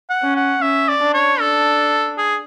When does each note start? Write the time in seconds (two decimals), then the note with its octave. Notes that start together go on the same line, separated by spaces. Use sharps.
0.10 F#5
0.23 C#4
0.36 F#5
0.61 C#4 E5
0.88 D5
1.00 D4
1.14 C#5
1.40 D4 A4
2.18 G#4